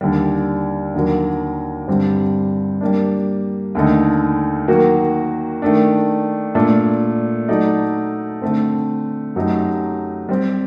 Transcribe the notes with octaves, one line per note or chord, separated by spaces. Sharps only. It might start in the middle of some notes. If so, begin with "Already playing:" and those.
D#2 D3 G3
D#2 D3 F#3 A#3
G2 D3 G3 C4 G4
G3 A#3 D4
D#2 D3 A3 D#4
D#3 F#3 A#3 F#4
D#3 A3 D4
A#2 A3 D4
F#3 A3 D#4 A4 D5
D3 A3 C4
F#2 F#3 A3 D#4 G4
G3 C4 G4